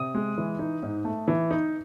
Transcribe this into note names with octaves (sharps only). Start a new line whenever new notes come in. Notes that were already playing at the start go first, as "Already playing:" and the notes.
Already playing: C3 D#6
G#3
E3
D#4
G#2
A3
E3
D#4